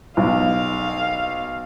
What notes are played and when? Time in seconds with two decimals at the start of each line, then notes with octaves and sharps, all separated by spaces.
0.17 B1 F5